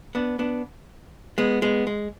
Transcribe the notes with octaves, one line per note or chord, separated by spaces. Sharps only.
B3 D4
B3 D4
G#3 B3
G#3 B3
G#3